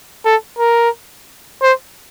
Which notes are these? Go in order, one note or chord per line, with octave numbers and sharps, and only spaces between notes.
A4
A#4
C5